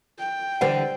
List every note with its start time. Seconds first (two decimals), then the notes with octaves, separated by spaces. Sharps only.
0.18 G5
0.61 D3 E3 G3 C5 F#5